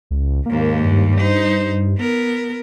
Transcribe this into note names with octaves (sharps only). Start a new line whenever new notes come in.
C#2
D#2 G#2 A#3
G2
D#4 C5
B3 A#4